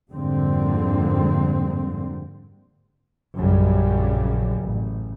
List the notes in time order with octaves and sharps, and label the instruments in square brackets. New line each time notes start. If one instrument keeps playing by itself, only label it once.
[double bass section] F2 G#2 D3 G3 A#3 C4
A#1 F#2 C#3 G3
A1